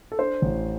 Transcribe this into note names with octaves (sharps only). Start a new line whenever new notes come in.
A4
D4 C5
A1